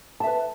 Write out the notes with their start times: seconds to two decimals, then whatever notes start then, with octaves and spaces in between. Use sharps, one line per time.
0.20 A5
0.23 E5
0.27 B4